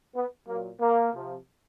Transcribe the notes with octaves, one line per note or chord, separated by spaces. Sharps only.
B3
A#2 F#3 A#3
A#3
C3 F3